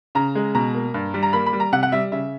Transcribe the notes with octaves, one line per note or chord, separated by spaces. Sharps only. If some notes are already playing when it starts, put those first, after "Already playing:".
C#3 A#5
G#3
B2 A#5
A#3
G2
G3
A#5
A#3 B5
B5
G3
A#5
C3 F#5
F#5
G3 E5
C#3 E5